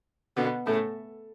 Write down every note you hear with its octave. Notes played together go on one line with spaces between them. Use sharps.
B2 D3 B3
A2 C#3 A3